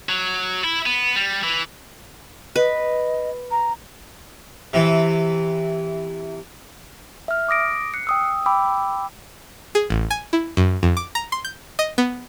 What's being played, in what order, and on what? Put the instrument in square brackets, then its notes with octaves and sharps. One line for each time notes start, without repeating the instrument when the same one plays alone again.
[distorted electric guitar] F#3
E4
B3
G3
E3
[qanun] B4 [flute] D#5
[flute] A#5
[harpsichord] C3 E3
[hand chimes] E5 F6
D6 D#6 A#6 D7
F#6 C7 C#7
G5 D#6 E6
G5 B5 D6 E6
[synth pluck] G#4
A1
G#5
E4
F#2
F2
D6
A#5
C6
G6
D#5
B3